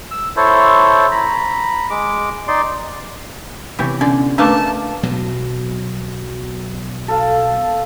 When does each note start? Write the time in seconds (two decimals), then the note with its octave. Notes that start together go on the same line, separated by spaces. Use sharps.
0.11 E6
0.36 E4 A4 C5 C#5
1.11 A#5 B5
1.90 G#3 D6
2.48 D#4 D5 C6
3.79 C3 E3 B3 G4 C#5
4.01 D3 C#4 D5
4.38 A3 A#3 D4 B4 G#5 A5 D6
5.03 B1 B2 F#3
7.08 A4 F5